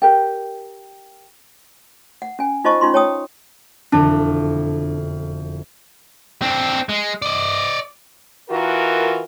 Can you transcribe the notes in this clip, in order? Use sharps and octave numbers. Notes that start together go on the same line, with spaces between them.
G4 A#4 G5
F#5
C#4 G#5
D#4 F4 C5 D#5 A5 C#6
C#4 D#4 F4 C6
C#5 G5 A5 D#6
E1 F2 D3 D4
C4 D4
G#3
D5 D#5
E3 F4 F#4 A#4